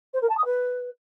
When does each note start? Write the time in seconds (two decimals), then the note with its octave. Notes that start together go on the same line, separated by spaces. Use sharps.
0.13 C5
0.21 A#4
0.29 A5
0.37 D#6
0.45 B4